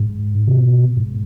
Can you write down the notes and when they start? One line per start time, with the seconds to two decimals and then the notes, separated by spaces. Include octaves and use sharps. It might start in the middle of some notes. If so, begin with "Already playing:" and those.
Already playing: G#2
0.47 C3
0.58 B2
0.97 G#2